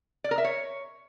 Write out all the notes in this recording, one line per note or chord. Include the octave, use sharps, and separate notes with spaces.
D5
A#4
E5
C#5